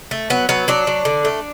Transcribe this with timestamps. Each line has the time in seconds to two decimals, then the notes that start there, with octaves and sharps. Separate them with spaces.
0.11 A3
0.30 F#3 B3
0.49 F#3 B3
0.68 F#3 D4
0.87 F#3
1.05 D3
1.25 A3